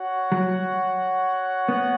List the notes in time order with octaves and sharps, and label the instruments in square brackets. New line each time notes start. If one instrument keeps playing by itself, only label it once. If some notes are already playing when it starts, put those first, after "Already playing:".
Already playing: [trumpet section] F#4 C#5 F#5
[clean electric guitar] F#3
B3